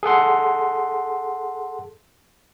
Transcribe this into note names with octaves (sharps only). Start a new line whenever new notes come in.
G#4 A4 F#5 C6